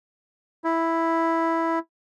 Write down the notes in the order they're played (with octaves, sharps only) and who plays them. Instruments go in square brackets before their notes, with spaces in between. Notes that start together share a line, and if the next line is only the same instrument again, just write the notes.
[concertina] E4